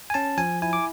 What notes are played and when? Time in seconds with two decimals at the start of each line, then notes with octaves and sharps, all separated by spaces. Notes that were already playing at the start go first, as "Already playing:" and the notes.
0.10 G#5
0.14 C#4 A5
0.38 F3 G#5
0.62 E4 G#5
0.73 D6